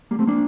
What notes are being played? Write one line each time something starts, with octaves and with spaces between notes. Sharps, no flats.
G3 A#3
A3 C4
A#3 D4